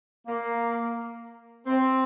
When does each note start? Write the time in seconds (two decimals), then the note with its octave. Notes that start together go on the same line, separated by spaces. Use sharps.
0.26 A#3
1.66 C4